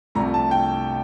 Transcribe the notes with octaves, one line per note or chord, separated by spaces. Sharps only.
C2 C3 F3 A3 A#5
A5
G5